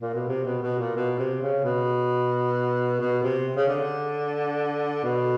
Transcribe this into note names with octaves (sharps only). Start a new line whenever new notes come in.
A#2
B2
C3
B2
B2
A#2
B2
C3
C#3
B2
B2
C3
C#3
D3
B2